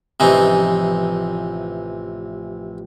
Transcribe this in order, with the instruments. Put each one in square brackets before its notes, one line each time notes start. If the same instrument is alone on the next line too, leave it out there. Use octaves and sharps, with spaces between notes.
[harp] A1 F3 G#5 [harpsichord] C3 E3 D#4